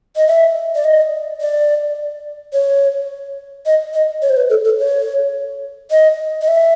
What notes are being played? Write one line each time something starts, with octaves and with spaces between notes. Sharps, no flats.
D#5
E5
D5
D#5
D5
C#5
D#5
D#5
C#5
C5
B4
A4
A4
C#5
D#5
D#5
E5